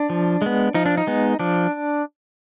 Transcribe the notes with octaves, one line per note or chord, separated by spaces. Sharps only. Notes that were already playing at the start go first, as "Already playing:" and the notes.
Already playing: D4
F3
G#3 B3
F3 D#4
D4
D#4
G#3 B3
F3 D4